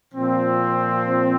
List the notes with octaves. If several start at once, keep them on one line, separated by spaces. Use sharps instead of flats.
A#2 F3 C4